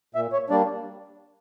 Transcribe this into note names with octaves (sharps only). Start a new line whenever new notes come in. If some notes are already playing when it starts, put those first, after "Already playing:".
A#2 E5
C#5
G3 A#3 D4 D5